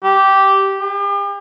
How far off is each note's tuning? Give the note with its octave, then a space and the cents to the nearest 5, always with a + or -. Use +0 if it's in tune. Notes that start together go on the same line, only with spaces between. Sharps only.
G4 -10
G4 +40